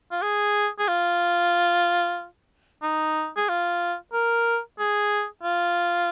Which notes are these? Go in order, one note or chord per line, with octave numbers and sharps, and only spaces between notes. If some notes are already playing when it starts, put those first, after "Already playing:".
F4
G#4
G#4
F4
D#4
G#4
F4
A#4
G#4
F4